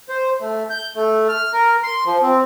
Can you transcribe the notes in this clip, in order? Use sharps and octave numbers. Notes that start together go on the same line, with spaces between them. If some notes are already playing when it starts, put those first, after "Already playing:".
C5
A3
G6
A3
F6
A#4
C6
F3
C4